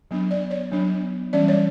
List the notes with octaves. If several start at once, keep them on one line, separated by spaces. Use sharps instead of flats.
F#3 B3 D4
D5
C#5
F#3 B3 D4
E3 G3 C#4 D5
C#5